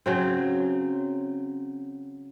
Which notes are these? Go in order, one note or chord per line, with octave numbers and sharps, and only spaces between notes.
C#3 F#3 C4